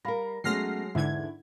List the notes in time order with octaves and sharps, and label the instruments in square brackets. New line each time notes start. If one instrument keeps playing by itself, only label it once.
[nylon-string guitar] G3 A#4 [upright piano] F5 B5 A#6
[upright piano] F#3 G#3 [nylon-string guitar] A3 B3 C#4 [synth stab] F6 A#6 C7
[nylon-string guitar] E2 [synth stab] G#2 D3 G#6 [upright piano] E4